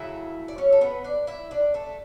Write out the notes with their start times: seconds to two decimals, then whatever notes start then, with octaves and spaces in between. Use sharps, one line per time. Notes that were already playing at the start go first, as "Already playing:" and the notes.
Already playing: C#3 F#3 A3 E4 E5
0.48 D5
0.58 C#4 C#5
0.72 A4
0.81 B3 B4
1.04 D4 D5
1.27 E4 E5
1.51 D4 D5
1.74 A3 A4